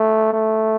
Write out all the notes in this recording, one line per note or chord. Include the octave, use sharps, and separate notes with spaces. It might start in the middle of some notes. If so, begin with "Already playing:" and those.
Already playing: A3
A3